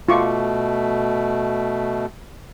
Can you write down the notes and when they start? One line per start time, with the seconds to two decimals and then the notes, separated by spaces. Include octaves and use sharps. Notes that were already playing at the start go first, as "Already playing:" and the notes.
0.09 B2 A3 F4 C#6 D6